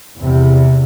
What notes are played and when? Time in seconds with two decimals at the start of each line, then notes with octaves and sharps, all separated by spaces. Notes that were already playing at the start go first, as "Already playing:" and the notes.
0.19 E2 C3